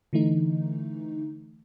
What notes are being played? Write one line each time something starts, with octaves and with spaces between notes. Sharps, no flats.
D3 E3 A3 D#4